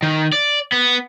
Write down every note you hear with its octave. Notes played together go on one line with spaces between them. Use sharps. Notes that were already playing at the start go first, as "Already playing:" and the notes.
D#3
D5
B3